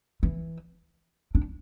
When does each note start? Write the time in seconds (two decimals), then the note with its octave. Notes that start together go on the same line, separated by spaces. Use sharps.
0.23 E3
1.35 D4